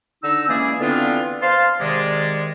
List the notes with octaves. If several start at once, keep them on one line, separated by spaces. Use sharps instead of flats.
D3 D#4 E6
E3 G#3 A#3 C#4 G#4 D5
D3 E3 B3 C4 D4 F4
C5 F5 A5 C6
C3 D#3 G#3 D5